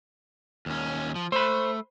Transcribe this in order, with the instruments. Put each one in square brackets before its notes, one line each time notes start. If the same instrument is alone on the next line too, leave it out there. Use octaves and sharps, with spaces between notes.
[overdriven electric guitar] D#2 C#4
F3
[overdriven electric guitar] A3 [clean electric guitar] C5 B5